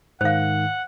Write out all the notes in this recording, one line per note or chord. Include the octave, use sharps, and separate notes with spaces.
G#2 D#3 C5 F5 F#5